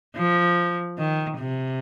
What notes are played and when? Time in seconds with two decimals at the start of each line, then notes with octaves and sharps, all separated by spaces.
0.17 F3
0.99 D#3
1.39 C3